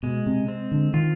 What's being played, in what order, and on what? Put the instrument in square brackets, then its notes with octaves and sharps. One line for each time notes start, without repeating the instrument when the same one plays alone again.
[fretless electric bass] B2 [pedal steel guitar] G#3
[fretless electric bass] C3
[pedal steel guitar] C4
[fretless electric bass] D3
[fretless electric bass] D#3 [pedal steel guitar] F4